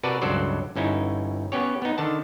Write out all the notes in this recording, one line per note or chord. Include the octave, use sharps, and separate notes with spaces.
C3 F#4 A#4 B4 D5 A5
C#2 G2 F#3 A4 C5 D5
G1 C#4 D#4 E4
B3 C#4 G4 C#5
B3 D#4
D3 D#3 A5